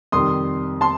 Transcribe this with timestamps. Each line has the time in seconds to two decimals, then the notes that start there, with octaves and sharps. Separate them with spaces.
0.12 F2 C3 D#3 G3 C6 D#6
0.81 A5 C6